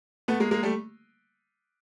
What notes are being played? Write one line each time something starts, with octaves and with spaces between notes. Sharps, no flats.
A3 B3
G#3 A#3
G#3 A#3
G3 A3